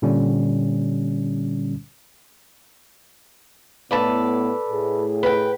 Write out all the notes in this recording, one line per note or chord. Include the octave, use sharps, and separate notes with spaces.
A#2 D3 G3 C#4
A2 B3 A4 B4 D5
A2 G#4
B4 G5